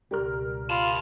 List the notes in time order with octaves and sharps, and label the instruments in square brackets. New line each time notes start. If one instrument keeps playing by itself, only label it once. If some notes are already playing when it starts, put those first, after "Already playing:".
[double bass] C#2 B2 [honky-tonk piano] G3 A#4 F6
[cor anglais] F4 [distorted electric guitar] A5 B5